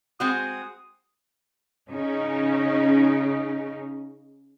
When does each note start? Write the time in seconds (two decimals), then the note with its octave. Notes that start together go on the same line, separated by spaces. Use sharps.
0.20 G#3 C4 F#4 D#6
1.89 C#3 C#4 D#4